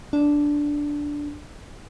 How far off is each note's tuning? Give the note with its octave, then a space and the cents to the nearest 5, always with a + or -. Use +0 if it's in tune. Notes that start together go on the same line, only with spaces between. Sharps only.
D4 -5